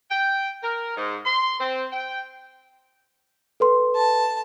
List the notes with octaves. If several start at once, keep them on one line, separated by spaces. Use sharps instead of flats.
G5
A#4
G#2
C6
C4
G5
A4 B4 C6
A5